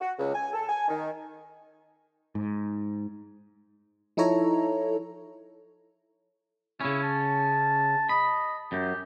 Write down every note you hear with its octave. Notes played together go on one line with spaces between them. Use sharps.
F#4
C#2
G#5
A4
G#5
D#3
G#2
F3 D#4 E4 A4 C#5 A#5
C#3 C#4 E4
A5
D#5 B5
F#2 G4